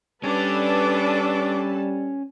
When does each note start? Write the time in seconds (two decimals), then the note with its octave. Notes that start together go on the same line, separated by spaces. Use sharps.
0.24 G3 C#4 D4 A4 B4 A5 D6